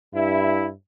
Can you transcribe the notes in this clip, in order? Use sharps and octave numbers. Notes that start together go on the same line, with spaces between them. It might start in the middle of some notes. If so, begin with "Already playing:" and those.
G2 E4